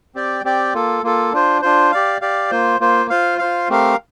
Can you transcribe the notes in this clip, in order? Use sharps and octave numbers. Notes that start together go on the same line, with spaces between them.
C4 G4 D5 G5
C4 G4 D5 G5
A#3 F4 A4
A#3 F4 A4
D4 F4 C5
D4 F4 C5
G4 D5 F5
G4 D5 F5
A#3 F4 C5
A#3 F4 C5
F4 C5 F5
F4 C5 F5
A3 C4 G4 A#4 F5